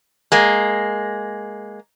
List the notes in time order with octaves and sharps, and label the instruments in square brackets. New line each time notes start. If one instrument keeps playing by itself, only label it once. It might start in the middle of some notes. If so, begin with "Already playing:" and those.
[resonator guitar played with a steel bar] G#3 A#3